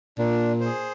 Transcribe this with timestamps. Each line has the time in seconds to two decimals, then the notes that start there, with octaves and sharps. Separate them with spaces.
0.18 A#2 D4
0.60 G#4 C5